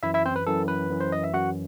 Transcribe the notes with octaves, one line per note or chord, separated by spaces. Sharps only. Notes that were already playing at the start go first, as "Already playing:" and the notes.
F#2 E3 E4 E5
E4 E5
C4 C5
B4
F#2 E3 A4
B4
F#2 E3
C5
D#5
E5
F#2 E3 F#4 F#5